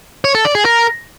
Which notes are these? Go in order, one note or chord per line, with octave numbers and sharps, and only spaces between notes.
C#5
A4
D5
G#4
A#4